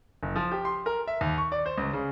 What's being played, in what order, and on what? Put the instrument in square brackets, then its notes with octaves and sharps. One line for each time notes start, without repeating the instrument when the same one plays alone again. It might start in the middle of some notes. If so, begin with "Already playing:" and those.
[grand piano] F#1
F3
G4
C6
A#4
E5
D#2
C#6
D5
C5
C#2
C#3